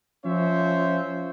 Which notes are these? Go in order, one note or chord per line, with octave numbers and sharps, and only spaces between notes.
F3 C#4 F4 C5 C#5 E5